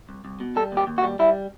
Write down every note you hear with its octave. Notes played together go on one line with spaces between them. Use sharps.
C2
C2
B2
G3 A4
D#2
G4
D#2
F#4
G3
G3 E4